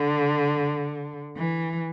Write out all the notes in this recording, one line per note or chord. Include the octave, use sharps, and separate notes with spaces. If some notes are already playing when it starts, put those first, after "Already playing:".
Already playing: D3
E3